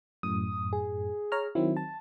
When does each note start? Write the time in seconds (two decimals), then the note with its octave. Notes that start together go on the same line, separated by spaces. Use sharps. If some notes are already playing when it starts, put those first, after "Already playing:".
0.23 F#2 A2 D#6
0.73 G#4
1.32 C#5 A#5 F6
1.55 D#3 F#3 C4 E4
1.77 A5